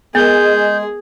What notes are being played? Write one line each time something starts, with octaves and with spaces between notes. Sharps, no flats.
G#3 B3 G#4 A#4 G6